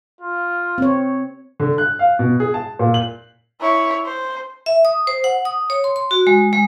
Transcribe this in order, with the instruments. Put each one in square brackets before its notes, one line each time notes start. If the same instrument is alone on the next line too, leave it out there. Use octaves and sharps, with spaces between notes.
[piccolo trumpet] F4
[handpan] C4 C#5
[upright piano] D3
F#6
F5
B2
G#4
A5
A#2
F#7
[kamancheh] E4 C#5
C5
[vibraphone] E5
D#6
C5
F#5
D#6
C#5
C6
C6
F#4
G#3
G#3